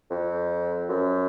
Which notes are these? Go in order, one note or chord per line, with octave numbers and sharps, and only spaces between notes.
F2
F#2